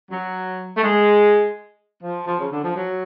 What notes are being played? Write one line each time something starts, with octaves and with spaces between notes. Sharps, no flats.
F#3
A3
G#3
F3
F3
C#3
D3
F3
F#3